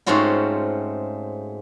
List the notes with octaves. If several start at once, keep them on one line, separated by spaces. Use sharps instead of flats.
G#2 A3 C4 C#4 F4 F#4